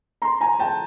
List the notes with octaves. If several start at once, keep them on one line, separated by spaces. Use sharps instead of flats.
A#5 C6
G#5 A#5
G5 A5